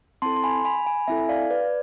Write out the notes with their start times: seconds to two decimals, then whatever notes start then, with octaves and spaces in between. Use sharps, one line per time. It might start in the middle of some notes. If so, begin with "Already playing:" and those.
0.22 C4 E4 A4 A5 C6
0.36 C6
0.44 G#5 B5
0.65 G#5 B5
0.86 G#5 B5
1.08 C4 E4 A4 E5 G#5
1.29 D5 F5
1.50 B4 D5